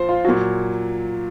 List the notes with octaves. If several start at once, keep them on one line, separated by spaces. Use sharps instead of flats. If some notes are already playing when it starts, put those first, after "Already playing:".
Already playing: A#2 F3 C5
F4
A#2 F#3 F#4